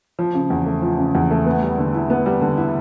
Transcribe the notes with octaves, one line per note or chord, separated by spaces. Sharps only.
F3
C#3
E2
A3
F3
C#3
E2
A3
B3
G3
D3
E4
B3
G3
D3
E4